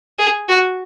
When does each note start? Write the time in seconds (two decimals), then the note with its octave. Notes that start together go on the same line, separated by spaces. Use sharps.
0.19 G#4
0.48 F#4